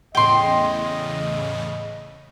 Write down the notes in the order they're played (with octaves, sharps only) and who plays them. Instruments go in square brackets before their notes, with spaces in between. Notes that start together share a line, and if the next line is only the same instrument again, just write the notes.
[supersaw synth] E2 A2 C#3 [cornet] D#5 [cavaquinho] G5 C6